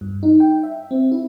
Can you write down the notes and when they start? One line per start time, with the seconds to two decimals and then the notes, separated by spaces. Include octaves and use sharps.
0.01 G2
0.23 D#4
0.40 G5
0.63 E5
0.91 C4
1.12 E4